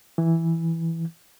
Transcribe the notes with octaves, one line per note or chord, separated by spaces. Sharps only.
E3